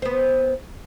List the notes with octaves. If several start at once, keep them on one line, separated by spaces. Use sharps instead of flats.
B3 C5